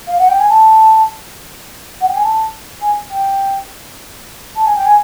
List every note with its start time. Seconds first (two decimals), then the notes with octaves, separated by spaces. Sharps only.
0.07 F5
0.18 F#5
0.29 G5
0.39 G#5
0.49 A5
2.01 F#5
2.08 G5
2.16 G#5
2.24 A5
2.81 G#5
3.10 G5
4.56 A5
4.66 G#5
4.76 G5
4.85 G#5